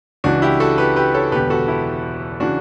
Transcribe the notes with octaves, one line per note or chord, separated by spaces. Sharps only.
C#2 C#3 E3 D4 F#4
E4 G4
F#4 A4
G4 B4
G4 B4
A4 C#5
E1 E2 D3 G4 B4
F#4 A4
E4 G4
C#3 E3 D4 F#4